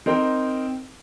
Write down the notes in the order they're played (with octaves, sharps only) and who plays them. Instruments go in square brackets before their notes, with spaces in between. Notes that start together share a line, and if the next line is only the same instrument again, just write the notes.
[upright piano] C4 D#4 A#4 G5